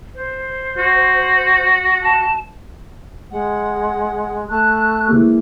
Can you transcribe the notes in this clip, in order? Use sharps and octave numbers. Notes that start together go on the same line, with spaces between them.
C5
F#4
A5
G#3 F#5
A3 A5 F#6
E3 G#3 A#3